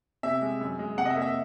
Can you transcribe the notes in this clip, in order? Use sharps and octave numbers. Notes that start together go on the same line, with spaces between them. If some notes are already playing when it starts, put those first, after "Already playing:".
C3 E5
G#3
F#2
G#3
C3 F#5
D#5
E5
A#3
E5